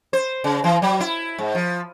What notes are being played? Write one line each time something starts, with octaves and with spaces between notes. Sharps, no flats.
C5
C#3
E3
F#3
E4
G#2
F3